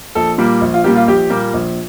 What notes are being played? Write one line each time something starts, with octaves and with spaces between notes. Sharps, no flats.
A#1 A4
A#2 G3 A#3
A#1
F4
A#2 G3 A#3 G4
F4
A#1 G4
A#2 G3 A#3
A#1